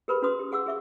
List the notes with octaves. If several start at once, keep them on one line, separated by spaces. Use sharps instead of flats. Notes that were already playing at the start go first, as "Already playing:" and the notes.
G4 G#4 A#4 B4 B5 C#6
C#4 F#4 B4 C6 D#6
G4
G#4 F#5 D6 E6
G#4 E5 C#6